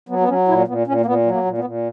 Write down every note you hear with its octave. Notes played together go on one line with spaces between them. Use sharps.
F#3 B3
B3
F#3 C#4
A#2 E4
A#2 B3
A#2 C#4
A#3
A#2 B3
F#3
A#3
A#2
B3
A#2